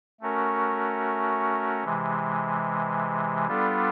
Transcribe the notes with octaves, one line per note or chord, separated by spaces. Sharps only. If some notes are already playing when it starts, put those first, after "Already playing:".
A3 C#4 F#4 A#4
C3 E3 G#3
G3 B3 D4 F4 A4